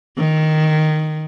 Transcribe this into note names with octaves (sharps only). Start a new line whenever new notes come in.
D#3